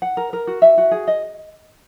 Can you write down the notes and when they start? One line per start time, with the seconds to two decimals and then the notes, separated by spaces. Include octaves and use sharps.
0.02 F#5
0.17 A#4
0.33 A#4
0.47 F#4
0.62 E5
0.78 F#4
0.91 G#4
1.08 D#5